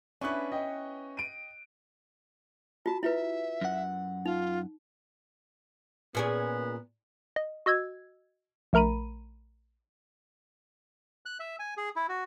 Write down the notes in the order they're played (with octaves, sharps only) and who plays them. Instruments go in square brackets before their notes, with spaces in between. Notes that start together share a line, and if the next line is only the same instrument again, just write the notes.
[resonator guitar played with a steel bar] B3 E4 B4 [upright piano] C#4 C#6 [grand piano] D4 F#6
[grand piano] D#5 G5
[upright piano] D7 D#7
[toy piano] F4 F#4 [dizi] A5
[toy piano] E4 F4 B4 [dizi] E5
[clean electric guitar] F#2 F#5
[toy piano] D#4 [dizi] F4
[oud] A#2 C#4 G#4 [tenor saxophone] B3
[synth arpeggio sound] D#5
F#4 D#5 E6 G#6
A#1 A3 A#4 A#5 B5 D#7
[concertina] F#6
E5
G#5
G#4
E4
F#4